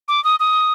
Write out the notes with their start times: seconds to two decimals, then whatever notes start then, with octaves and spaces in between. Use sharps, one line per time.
0.08 D6
0.24 D#6
0.40 D#6